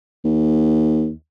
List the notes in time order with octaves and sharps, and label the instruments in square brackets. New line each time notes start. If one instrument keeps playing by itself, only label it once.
[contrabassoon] D#2